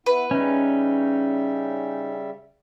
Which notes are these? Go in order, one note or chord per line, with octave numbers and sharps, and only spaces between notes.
B3 E4 B4
C#3 G3 C#4 D#4 E5